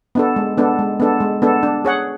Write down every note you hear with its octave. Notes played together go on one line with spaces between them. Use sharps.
B3 D4 A4
G#3
B3 D4 A4
G#3
B3 D4 A4
G#3
B3 D4 A4
D4
G#4 C#5 F#5